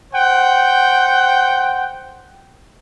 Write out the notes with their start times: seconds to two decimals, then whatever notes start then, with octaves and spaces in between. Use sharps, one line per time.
0.13 C5 F#5 G5